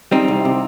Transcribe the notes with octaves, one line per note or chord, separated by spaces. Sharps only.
G3 C4 D#4
C2
C3